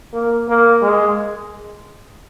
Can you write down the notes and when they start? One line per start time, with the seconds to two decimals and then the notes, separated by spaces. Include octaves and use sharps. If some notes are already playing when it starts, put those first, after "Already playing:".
0.13 A#3
0.49 A#3
0.82 G#3